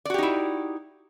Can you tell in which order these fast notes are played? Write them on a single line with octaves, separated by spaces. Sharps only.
D5 F#4 G4 D#4 E4